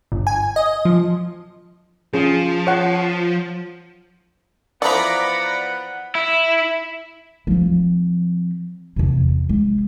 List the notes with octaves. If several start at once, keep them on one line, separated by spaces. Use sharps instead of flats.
G1
G#5
D#5
F3
F3 C#4 G#4
C#5 F#5
E3 F3 B3 B4 D5 F#5 A#5 B5
E4
F3 C4
E2 C3
G#3